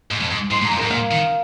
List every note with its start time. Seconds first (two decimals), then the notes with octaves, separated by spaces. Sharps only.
0.11 G#2
0.20 F2
0.31 G#2
0.51 G#2 C6
0.62 G#2
0.65 A#5
0.71 F2
0.77 G#2 A#4
0.91 A#2 F5
1.11 D#3